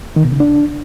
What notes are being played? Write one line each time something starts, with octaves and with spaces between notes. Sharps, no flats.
D#3
B2
C#3
D4